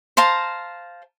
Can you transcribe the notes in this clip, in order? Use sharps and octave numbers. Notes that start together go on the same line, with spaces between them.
C5 F5 A5 A#5